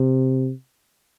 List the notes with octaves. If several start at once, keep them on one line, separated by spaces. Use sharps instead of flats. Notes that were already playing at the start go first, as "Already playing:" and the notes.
Already playing: C3